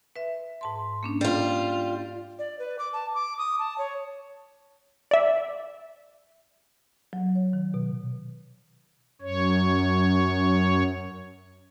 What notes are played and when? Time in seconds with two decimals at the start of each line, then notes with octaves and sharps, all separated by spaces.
0.16 B4 E5
0.61 G#2 A5 C6
1.03 A#3 C#4 D4
1.21 G3 F4
2.39 D5
2.59 B4
2.79 D6
2.93 A5
3.14 D6
3.38 D#6
3.59 A5
3.78 C#5
5.11 D5 E5
7.13 F#3
7.35 C#5
7.53 D#3
7.74 B2
9.22 F#2 C#5